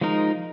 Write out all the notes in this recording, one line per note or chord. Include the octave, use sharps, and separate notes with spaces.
F3 G#3 D#4 A#4